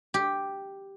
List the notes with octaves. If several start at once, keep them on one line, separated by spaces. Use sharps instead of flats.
G4